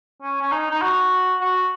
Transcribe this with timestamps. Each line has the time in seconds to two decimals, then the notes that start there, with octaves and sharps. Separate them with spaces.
0.22 C#4
0.41 C#4
0.52 D#4
0.71 D#4
0.82 F#4
1.41 F#4